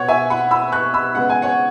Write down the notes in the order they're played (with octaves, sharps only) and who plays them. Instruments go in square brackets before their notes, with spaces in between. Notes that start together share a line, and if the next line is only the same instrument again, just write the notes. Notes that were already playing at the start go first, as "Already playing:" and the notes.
Already playing: [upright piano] B2 B3 C#5 F#5
E5 G#5
F#5 B5
B5 E6
C#6 F#6
B5 E6
C#3 G#3 B3 F#5
G#5
C#5 F#5